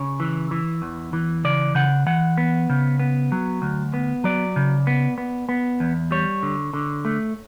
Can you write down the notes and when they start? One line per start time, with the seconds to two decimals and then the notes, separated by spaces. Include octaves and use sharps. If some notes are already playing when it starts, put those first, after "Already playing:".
Already playing: C#3 C#5
0.20 E3
0.51 E3
0.82 E2
1.13 E3
1.44 C#3 D5
1.75 C#3 F#5
2.07 E3 F#5
2.38 B3
2.70 C#3
3.00 B3
3.32 F#3
3.62 D2
3.94 B3
4.24 F#3 D5
4.56 C#3
4.87 B3
5.18 B3
5.49 B3
5.80 E2
6.11 G3 C#5
6.43 D3
6.74 D3
7.05 A3